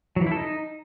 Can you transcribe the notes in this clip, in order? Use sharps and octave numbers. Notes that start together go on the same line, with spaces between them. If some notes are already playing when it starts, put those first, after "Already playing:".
F#3
E3
E4
A4
D#4